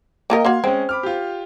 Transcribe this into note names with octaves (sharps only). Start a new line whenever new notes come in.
A#3 F4 A#4 D#5 G5
A#3 F#4 F5 C6 G#6
G#3 C4 C#4
B5 D6 F6
F4 G4